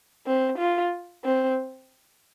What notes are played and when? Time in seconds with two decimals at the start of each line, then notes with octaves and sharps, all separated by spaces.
0.26 C4
0.59 F4
1.24 C4